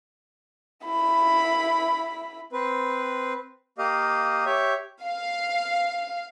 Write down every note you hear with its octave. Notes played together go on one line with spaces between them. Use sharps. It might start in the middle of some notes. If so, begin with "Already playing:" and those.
E4 B5
C4 B4
A#3 G4 D#5 F5
G4 C#5 E5
F5